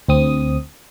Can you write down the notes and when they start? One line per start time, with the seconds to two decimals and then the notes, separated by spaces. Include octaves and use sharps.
0.08 D2 C4 D#6